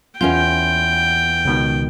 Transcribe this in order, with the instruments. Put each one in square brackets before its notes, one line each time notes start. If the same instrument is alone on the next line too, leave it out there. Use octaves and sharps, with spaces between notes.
[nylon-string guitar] E2 C#4 F4 [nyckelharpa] G5 [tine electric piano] G6
[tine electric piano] C#2 B2 D#3